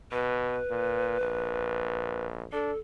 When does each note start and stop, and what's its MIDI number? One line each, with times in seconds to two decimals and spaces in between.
0.12 0.60 47
0.12 2.26 71
0.70 1.17 46
1.21 2.45 34
2.52 2.72 62
2.52 2.78 69